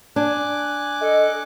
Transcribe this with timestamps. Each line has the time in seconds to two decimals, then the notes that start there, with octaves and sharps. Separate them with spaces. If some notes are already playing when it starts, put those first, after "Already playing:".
0.16 D4 G#5 D6 F#6
1.01 A4 D#5